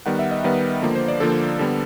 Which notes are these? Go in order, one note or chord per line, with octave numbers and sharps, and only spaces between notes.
D#3 G3 B3 F#5
E5
D#5
D#3 G3 B3 B4
D3 F3 A#3
C5
D5
D3 F3 A#3 A4
D3 G3 B3